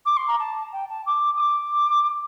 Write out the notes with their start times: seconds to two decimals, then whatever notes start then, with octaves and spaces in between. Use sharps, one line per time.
0.06 D6
0.17 C6
0.27 A#5
0.39 A5
0.73 G5
0.89 A5
1.06 D6
1.36 D#6
1.40 D6